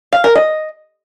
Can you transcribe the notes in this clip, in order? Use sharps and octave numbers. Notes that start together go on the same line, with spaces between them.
F5
A#4
D#5